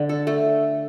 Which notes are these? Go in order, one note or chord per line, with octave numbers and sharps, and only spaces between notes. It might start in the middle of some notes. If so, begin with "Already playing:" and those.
Already playing: D3
A4
A3